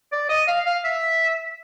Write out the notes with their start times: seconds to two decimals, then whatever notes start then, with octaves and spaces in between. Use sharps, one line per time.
0.12 D5
0.29 D#5
0.48 F5
0.66 F5
0.84 E5